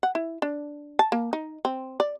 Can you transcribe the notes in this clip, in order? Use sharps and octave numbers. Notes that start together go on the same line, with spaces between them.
F#5
E4
D4
A5
A#3
D#4
C4
D5